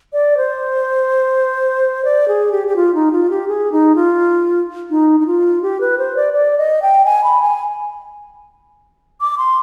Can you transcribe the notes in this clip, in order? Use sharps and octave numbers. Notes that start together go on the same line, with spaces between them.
D5
C5
D5
G#4
G4
G4
F4
D#4
F4
G4
G#4
D#4
F4
D#4
D#4
F4
G4
B4
C5
D5
D5
D#5
G5
G#5
B5
G#5
D6
C6